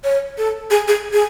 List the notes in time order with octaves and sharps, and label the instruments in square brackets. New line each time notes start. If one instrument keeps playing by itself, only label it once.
[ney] C#5
A4
G#4
G#4
G#4